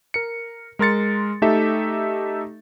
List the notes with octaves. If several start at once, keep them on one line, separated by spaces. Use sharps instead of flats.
A#4 C#7
G#3 A#4 C6 A6 C#7
A3 D#4 G4 A4 E5